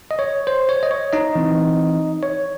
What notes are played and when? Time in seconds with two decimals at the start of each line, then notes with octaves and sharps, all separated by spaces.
0.11 D#5
0.19 C#5
0.47 C5
0.69 C#5
0.83 D#5
0.91 C#5
1.13 D#4 D#5
1.35 E3 C4
2.23 C#5